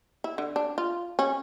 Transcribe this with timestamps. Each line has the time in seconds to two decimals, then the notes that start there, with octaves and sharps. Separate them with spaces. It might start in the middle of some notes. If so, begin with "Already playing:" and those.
0.24 E4
0.38 D3
0.56 D4
0.78 F4
1.19 C#4